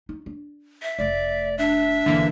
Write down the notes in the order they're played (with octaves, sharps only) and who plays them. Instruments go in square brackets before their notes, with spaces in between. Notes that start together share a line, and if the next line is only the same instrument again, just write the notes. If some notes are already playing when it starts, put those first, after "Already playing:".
[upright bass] D#4
D4
[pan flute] E5
[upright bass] F1 A3 [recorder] D5
[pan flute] D4 [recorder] E5
[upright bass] G1 B2 [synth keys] D3 E3 A#3